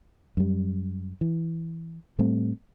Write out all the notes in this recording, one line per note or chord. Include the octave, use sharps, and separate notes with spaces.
F#2 G3
E3
A2 G3 A3 C4